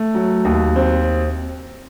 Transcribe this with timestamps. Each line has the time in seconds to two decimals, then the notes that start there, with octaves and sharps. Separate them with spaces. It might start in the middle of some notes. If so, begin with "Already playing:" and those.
Already playing: A3
0.15 F#3
0.45 D#2
0.76 C4